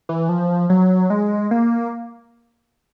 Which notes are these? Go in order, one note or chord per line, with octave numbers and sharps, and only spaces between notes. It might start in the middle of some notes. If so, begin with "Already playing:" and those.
E3
F3
F#3
G#3
A#3